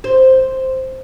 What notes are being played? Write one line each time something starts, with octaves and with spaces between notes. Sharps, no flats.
C5